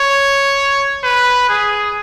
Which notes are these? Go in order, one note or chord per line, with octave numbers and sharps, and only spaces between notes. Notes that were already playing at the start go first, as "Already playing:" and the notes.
Already playing: C#5
B4
G#4